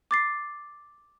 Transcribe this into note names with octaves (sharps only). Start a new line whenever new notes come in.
D6 A6 C7